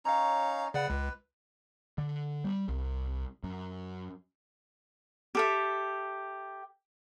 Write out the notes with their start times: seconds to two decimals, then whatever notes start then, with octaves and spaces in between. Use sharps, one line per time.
0.05 C#4 D#4 C#5 F5 A#5
0.74 C#3 B4 D5 F#5
0.90 C#2
1.98 D3
2.44 G3
2.68 C2
3.43 F#2
5.35 G4 A4 E5